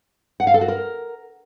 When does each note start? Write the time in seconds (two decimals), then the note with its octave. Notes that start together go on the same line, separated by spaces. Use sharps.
0.40 F#5
0.47 F5
0.54 A4
0.61 F#4
0.68 A#4